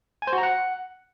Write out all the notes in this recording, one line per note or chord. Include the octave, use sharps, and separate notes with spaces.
G#5
C5
F#4
A#5
F#5